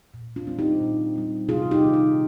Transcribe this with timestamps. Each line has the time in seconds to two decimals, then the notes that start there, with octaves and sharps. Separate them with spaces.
0.14 A#2
0.36 D4 F4
0.47 G3 C4
0.59 D#4 G4
0.81 A#2
1.15 G3 C4
1.48 C3 F4 G#4
1.71 D#4 G4
1.82 D#3 A#3
1.94 D#4